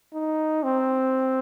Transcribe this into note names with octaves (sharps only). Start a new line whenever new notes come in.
D#4
C4